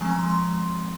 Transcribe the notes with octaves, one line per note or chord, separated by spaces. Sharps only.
F3 G#3 C4 G#5
A#5
C6
C6